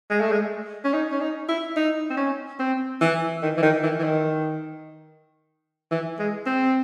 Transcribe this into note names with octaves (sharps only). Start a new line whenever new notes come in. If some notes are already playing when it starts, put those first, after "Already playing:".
G#3
A3
G#3
C#4
D#4
C#4
D#4
E4
D#4
C4
C#4
C4
E3
D#3
E3
D#3
E3
E3
D#3
E3
G#3
C4